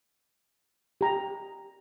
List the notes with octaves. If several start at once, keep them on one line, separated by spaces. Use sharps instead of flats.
G4 A#5